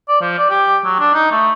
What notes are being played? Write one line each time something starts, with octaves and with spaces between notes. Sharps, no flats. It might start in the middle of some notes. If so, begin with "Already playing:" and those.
D5
F3
D5
G4
F#3
D4
D#4
A3